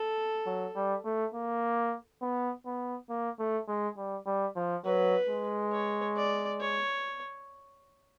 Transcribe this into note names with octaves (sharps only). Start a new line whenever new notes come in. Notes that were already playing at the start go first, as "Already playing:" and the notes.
Already playing: A4
F#3
G3
A3
A#3
B3
B3
A#3
A3
G#3
G3
G3
F3
F#3 B4
G#3
C#5
D5
C#5